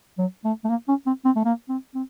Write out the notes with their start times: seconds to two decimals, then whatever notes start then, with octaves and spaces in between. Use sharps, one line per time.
0.18 F#3
0.45 A3
0.64 A3
0.70 A#3
0.88 C#4
1.06 C4
1.25 C4
1.36 A3
1.45 A#3
1.69 C4
1.95 C4